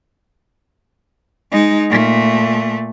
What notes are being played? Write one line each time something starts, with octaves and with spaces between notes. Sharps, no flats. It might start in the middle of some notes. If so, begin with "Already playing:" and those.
G#3 D#4
A#2 A3